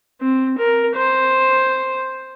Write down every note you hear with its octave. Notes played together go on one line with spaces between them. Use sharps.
C4
A#4
C5